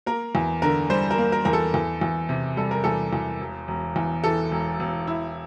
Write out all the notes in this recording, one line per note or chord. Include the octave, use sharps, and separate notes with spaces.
A#3 A#4
E2
D3 A#4
G3 C5
A#4
A#3
A#4
E2 A#4
A4
E2
E2
C3
G3 A4
A#4
E2 A4
E2
E1
E1
E2
E3 A4
E1
E1
E4